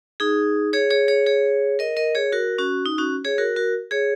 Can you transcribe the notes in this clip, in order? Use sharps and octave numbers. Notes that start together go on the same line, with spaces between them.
D#4 G#4
G#4 C#5
G#4 C#5
G#4 C#5
G#4 C#5
A#4 D#5
A#4 D#5
G#4 C#5
F#4 A#4
C#4 F#4
D#4
C#4 F#4
G#4 C#5
F#4 A#4
F#4 A#4
G#4 C#5